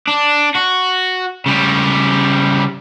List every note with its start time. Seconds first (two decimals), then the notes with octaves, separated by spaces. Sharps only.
0.08 D4
0.55 F#4
1.46 C#3 G3